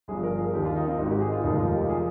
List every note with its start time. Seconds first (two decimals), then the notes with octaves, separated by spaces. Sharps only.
0.08 G1 G2 F3 G#4
0.23 A#4
0.38 G#4
0.53 D#2 D#3 G4
0.65 F4
0.76 D#4
0.87 C4
0.98 G#1 G#2 D#3 D#4
1.10 G4
1.21 G#4
1.32 F4
1.43 F1 D#2 D#3 D#4
1.59 F4
1.74 G4
1.88 F3 G#4